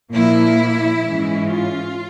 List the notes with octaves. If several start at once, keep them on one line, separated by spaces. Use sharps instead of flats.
A#2 F3 A#3 E4
G#2 E3 G#3 C#4
F4